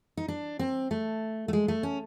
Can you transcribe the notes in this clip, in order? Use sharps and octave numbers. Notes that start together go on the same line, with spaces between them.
D#4
D4
C4
A3
A3
G#3
A3
C#4